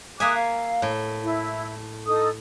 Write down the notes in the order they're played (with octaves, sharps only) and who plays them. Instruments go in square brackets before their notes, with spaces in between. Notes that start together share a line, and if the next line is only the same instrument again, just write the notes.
[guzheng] A#3 E5 G#5 [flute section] D6 D#6 F#6
[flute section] F5
[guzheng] A2
[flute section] E4
D#4 A4 D#6